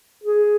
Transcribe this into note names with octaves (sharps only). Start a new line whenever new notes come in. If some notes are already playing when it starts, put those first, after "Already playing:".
G#4